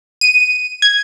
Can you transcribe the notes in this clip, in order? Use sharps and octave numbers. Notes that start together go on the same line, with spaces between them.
D#7
G#6